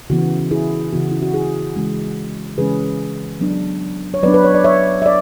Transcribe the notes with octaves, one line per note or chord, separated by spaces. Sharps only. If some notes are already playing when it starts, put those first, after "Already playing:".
C#3 E3 B3 F#4
E4 G#4
C#3 E3 B3 F#4
E4
F#4
E4 G#4
C#3 E3 G#3 C#4
C#3 E3 G#3 C#4 G#4 B4
F#3 B3 D4
C#5
F#3 B3 D4 B4 D5
B4
C#5
D5
C#5 E5
E5
D5